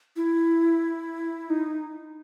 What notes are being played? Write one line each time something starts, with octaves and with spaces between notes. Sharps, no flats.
E4
D#4